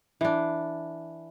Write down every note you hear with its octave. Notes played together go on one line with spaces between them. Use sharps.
E3 D4